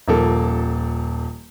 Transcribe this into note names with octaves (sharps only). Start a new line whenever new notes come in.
D#1 F3 A#3 A4